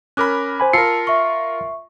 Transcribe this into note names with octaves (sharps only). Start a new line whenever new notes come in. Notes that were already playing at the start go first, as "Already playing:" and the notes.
C#4 A#4 B5 D6 F#6
C5 G#5 B5
F4 A#4 A5 E6 C7 C#7
E5 C#6